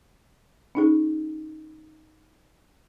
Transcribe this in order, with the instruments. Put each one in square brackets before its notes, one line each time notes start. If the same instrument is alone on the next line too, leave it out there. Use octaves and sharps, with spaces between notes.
[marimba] C#4 D#4 G#4